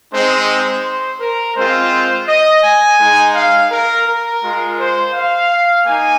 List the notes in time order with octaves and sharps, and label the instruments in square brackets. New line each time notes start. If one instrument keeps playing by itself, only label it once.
[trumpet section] G#3 C4 D#4 C5
C5
A#4
G#3 C4 F4 C5
D#5
G#5
G#3 D#4
F5
A#4
A#4
G#3 F4
C5
F5
A#3 D#4 G#5